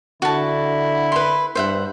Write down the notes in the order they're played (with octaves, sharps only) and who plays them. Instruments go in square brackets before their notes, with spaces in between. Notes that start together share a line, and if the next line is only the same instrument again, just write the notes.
[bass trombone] D3 [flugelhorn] E4 [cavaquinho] F#4 A5
[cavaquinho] B4 C6
[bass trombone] G2 [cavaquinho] C5 E5 F#5